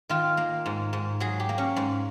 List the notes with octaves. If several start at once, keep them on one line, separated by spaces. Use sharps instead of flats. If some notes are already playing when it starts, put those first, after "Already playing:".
D#3 F4
A#3
G#2
G#2
F#3 G#4
G4
A#3
C#4
G#2